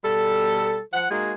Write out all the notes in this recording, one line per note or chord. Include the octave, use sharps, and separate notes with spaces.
B2 G3 A4
F3 F#5
G#3 A#3 D#4 F#4 G#4